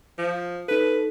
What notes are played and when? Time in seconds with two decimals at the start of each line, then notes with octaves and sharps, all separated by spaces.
0.18 F3
0.68 D#4 A4 B4